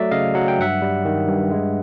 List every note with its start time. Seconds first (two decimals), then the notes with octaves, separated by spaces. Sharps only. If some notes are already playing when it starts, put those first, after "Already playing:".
Already playing: F#3 A3 D5 E5
0.11 C#3 D#5 F5
0.35 F#3 F#5
0.48 G5
0.59 G2 E5 F#5
0.82 G3
1.05 D#3
1.28 G2
1.52 G#3